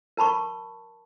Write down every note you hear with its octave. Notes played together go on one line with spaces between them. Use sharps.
A#4 A5 B5 C#6